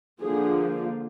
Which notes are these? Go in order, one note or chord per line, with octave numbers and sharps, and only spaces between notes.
D3 F3 A#3 G#4